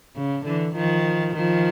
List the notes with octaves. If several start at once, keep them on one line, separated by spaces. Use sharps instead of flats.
C#3
D3 E3
D#3 F3
D#3 F3